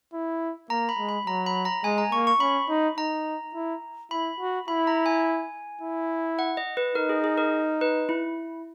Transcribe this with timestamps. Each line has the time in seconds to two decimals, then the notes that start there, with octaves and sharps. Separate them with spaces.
0.13 E4
0.70 A#3 A#5
0.89 B5
0.98 G#3
1.09 B5
1.27 F#3 A#5
1.46 B5
1.65 A#5
1.84 G#3 G#5
1.98 A#5
2.12 A#3 C#6
2.27 C#6
2.40 C#4 B5
2.69 D#4
2.97 D#4 A#5
3.55 E4
4.11 E4 B5
4.40 F#4
4.68 E4 B5
4.87 A#5
5.06 G#5
5.81 E4
6.39 F#5
6.57 D#5
6.77 B4
6.95 D#4 A#4
7.09 G#4
7.24 G#4
7.38 A#4
7.81 B4
8.09 E4